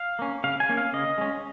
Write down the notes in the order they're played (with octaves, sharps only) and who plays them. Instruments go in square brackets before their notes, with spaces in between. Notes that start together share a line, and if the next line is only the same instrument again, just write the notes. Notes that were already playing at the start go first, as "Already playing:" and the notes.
Already playing: [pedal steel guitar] F5
A#3 C#4
C#3 F5
G#5
A#3 C#4
F5
C#3 D#5
G#3 C#4